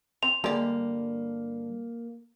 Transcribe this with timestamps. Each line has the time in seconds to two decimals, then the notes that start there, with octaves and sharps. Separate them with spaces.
0.23 C4 F7
0.44 G2 D3 G3 G#3 A#3 D5